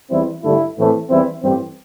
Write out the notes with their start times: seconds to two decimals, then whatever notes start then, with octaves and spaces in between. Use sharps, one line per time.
0.10 E2 E3 G3 C4 E4
0.43 G2 D3 A3 E4
0.76 A2 E3 A3 C4
1.09 E2 E3 G3 C4 E4
1.42 A1 G2 E3 C4 G4